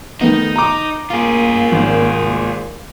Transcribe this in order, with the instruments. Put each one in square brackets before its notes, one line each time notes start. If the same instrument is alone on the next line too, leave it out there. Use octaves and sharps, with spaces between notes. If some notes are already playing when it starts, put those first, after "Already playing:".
[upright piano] D#3 A3 B3 [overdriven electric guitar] D#4
[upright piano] A#5 D6
[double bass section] A#3 [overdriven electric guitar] F4 G#4
[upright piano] G#1